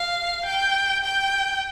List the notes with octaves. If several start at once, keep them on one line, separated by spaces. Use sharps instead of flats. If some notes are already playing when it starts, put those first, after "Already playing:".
Already playing: F5
G5
G5